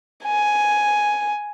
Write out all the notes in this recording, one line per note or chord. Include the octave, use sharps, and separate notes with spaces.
G#5